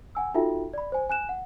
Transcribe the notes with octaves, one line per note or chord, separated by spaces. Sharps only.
F#5 G#5 E6
D#4 F4 F#4 A4 E5 G5
D5 B5
C5 G#5
G#5 F#6 E7
F#5